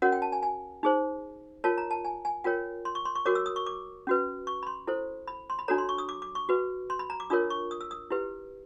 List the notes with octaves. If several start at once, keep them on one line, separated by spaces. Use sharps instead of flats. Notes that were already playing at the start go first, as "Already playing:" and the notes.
C#4 F#4 A#4 C#5 F#5
G5
A5
G#5
G#5
D#4 G#4 C5
F4 A#4 C#5 A5
A#5
A5
G#5
G#5
F4 A#4 C#5 G5
C6
C#6
C6
C#6
F#4 A#4 C#5 D6
E6
D#6
C#6
D6
C#4 F#4 B4
C#6
B5
C6
E4 A4 C5
B5
C6
B5
D4 F#4 A4 C#5 A#5
C6
C#6
D#6
D6
D6
C#6
F#4 B4
C6
B5
A#5
D6
D4 F4 A#4 C#5 D#6
C#6
D#6
E6
D#6
E4 G4 B4